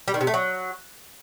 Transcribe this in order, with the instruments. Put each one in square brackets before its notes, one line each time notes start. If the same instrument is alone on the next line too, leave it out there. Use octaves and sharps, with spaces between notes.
[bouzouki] G3
D#3
C3
A3
F#3